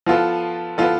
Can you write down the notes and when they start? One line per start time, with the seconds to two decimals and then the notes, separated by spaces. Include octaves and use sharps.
0.06 F3 B3 F4 A4
0.78 F3 B3 F4 A4